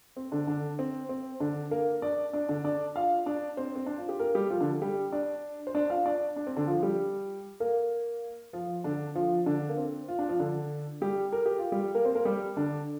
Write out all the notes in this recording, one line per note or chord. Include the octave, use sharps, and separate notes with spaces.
C4
D3 D4
D3 D4
C4
C4
D3 D4
A#3 A#4
D4 D5
D4 D5
D3 D4
D4 D5
F4 F5
D4 D5
C4 C5
C4
D4
F4
G4
A#3 A#4
G3 G4
F3 F4
D3 D4
G3 G4
D4 D5
C5
D4 D5
F4 F5
D4 D5
D4
C4
D3 D4
F3 F4
G3 G4
A#3 A#4
F3 F4
D3 D4
F3 F4
D3 D4
A#3
C4
F4
D4
F3 F4
D3 D4
G3 G4
A#4
G4
F4
G3 G4
A#3 A#4
C4 C5
A#3 A#4
G3 G4
D3 D4